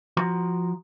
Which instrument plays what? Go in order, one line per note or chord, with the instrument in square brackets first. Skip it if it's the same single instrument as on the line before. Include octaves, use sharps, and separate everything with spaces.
[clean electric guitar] F3 F#4 A#5 C6